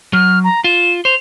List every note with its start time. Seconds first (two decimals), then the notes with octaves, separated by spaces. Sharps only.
0.13 F#3 F6
0.44 A#5
0.64 F4 E7
1.05 C5 F7